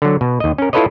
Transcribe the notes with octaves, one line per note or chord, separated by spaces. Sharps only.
D3 F#3
B2
D#2 D#5
C#4 A#4
E4 F4 A4 B4 C#5 D#5